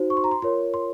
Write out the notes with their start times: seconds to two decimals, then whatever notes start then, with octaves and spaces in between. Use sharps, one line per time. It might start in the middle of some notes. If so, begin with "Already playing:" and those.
Already playing: D#4 F#4 C5
0.10 C#6
0.17 C6
0.24 A#5
0.31 C6
0.42 F4 A#4 C#5 C6
0.74 C6